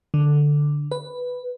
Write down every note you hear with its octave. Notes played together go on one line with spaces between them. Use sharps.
D3
B4